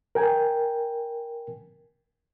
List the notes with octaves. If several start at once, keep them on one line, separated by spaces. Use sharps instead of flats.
A#4 G5 G#5